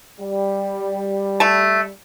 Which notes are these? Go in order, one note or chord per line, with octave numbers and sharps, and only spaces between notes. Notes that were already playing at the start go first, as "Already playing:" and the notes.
G3
A3 A5